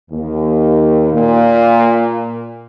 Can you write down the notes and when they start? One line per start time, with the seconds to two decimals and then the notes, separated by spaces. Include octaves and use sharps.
0.11 D#2
1.13 A#2